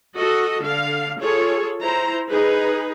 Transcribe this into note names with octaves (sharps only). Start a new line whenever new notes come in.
F#4 A4 D#5
D3 F5
F4 G#4 A4 C#5
E4 C5 A#5
D#4 G#4 B4